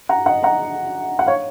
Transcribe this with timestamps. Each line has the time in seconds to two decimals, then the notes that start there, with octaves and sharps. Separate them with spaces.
0.09 F#5 A#5
0.26 D#5 F#5
0.43 F#5 A#5
1.19 F#5
1.26 C#5 F5